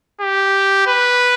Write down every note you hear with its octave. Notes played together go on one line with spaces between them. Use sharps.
G4
B4